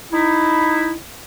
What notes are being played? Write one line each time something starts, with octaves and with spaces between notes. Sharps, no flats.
D#4 E4